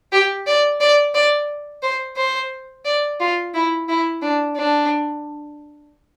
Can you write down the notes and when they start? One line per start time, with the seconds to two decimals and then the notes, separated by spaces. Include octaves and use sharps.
0.12 G4
0.47 D5
0.80 D5
1.14 D5
1.83 C5
2.17 C5
2.85 D5
3.20 F4
3.54 E4
3.88 E4
4.22 D4
4.56 D4